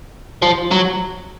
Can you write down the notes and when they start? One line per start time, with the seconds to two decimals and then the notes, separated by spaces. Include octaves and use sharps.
0.42 F3
0.72 F#3